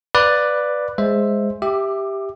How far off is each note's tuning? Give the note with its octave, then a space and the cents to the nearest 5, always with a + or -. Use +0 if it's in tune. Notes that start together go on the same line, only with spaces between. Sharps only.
B4 +0 D5 +5 F5 +5
G#3 -5 C5 +5 E5 +0
G4 +0 E5 +0 D6 +20